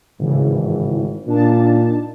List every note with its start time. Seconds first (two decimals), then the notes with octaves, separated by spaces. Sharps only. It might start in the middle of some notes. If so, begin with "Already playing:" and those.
0.19 G#1 A2 C#3 E3
1.27 A#2 D4 D#4 A5